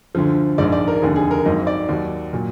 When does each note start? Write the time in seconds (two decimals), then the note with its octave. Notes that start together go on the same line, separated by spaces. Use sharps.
0.15 D2 D3 F3
0.58 A#1 G#2 D#3 D5
0.72 D5
0.88 A#4
1.02 F1 D#2 D3 G#4
1.16 G#4
1.31 A#4
1.45 G#1 G#2 F#3 D#5
1.67 D5
1.89 D#2 D#3 F#3
2.33 A#2 F#3